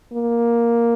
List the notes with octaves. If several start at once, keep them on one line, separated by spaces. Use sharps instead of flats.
A#3